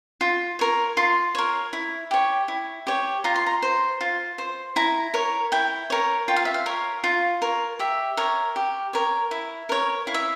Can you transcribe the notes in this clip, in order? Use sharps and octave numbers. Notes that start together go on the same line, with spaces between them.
F4
A#4 C#5
F4 C6
A#4 C#5
E4
G4 C#5
E4
G4 C#5
F4 A#5
C6
A#5
C5
F4
C5
E4 A#5
A#4 C#5
E4 G5
A#4 C#5
F4 G5
F5
E5
F5
A#4 C#5
F4
A#4 C#5
G4 E5
A#4 C#5
G4
A#4 C#5
E4
A#4 C#5
E4 F5
E5